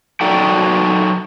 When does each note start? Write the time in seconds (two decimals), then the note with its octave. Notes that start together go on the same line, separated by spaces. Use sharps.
0.21 F#3 D#4 F#4 A4 D5 G5